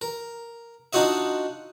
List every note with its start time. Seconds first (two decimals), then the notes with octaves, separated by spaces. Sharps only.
0.01 A#4
0.93 D4 D#4 F4 F#4 D#5 E5